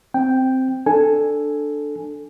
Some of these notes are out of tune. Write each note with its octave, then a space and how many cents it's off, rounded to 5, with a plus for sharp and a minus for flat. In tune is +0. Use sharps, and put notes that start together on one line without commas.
C4 -5 G5 +0
D4 +10 A4 +0 G#5 +0